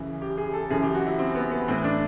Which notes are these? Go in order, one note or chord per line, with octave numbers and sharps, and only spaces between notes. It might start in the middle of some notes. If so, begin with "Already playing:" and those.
Already playing: F#2 C#3 E3
G4
G#4
A4
A4
F#2 C#3 E3 G#4
G4
F#4
E4
C4
B3
B3
A2 E3 C4
D4